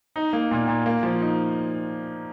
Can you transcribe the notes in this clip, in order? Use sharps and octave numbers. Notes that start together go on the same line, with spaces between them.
D#4
A#3
A#2
A#2
A#3
F3
D#4